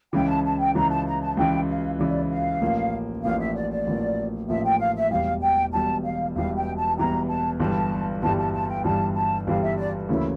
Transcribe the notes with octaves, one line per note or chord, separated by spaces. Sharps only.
C#2 C#3 E3 G5
A5
A5
G5
C#2 C#3 E3 A#5
A5
A#5
A5
C#2 C#3 E3 G5
F5
C#2 C#3 E3 D5
F5
A1 A2 F3 A#3
A1 A2 F3 A#3 F5
E5
D5
D5
A1 A2 F3 A#3
A1 A2 F3 A#3 E5
G5
F5
E5
E1 E2 E3 G3 F5
G5
E1 E2 E3 G3 A5
F5
E1 E2 E3 G3 F5
G5
A5
E1 E2 E3 G3 A#5
A5
G1 G2 E3 G3 A5
G1 G2 E3 G3 A5
A5
A5
G5
G1 G2 E3 G3 A5
A5
G1 G2 E3 G3 F5
E5
D5
D2 C#3 E3 A#3 C#4 E4